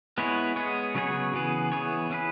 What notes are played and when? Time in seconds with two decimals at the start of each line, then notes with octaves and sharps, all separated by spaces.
0.18 G#3 B3 E4 G#4 C#5
0.56 G#3 B3 G#4 C#5
0.95 C#3 F#3 B3 G#4 C#5
1.34 C#3 E3 B3 G#4
1.72 E3 B3 G#4 C#5
2.10 E3 C#4 G#4 B4